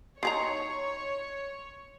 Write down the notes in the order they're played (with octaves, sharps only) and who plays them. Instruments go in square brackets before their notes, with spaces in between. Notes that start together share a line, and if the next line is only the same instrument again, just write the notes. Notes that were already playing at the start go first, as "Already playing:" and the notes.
[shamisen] D#3 G#4 A#5 [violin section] C#5 [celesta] C6 C7